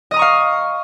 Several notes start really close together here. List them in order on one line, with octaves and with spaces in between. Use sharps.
D#5 D#6 A#5 C#6 F5